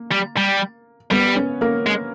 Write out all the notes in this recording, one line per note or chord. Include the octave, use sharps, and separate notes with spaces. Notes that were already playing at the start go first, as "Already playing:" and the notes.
Already playing: A#3
G3
G3
G3 B3 B4
C#4 C#5
A#3 A#4
G#3